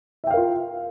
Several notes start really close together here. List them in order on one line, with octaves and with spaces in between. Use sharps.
E5 G5 F5 A#4 F4